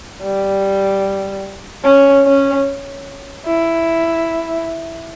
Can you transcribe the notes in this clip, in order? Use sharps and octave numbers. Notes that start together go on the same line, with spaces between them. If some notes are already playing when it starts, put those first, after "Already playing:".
G3
C#4
C#4
E4